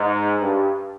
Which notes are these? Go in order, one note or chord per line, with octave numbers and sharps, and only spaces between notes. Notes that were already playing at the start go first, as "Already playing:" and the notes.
Already playing: G#2
G2